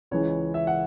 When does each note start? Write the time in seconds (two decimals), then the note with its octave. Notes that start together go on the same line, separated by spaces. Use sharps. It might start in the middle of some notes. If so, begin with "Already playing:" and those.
0.11 C#2 C#3 E3 G#3 C#5
0.54 E5
0.67 F#5